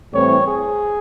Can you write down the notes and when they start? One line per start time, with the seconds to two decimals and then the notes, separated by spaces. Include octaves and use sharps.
0.13 A2 E3 G3 C4 C#5
0.47 G#4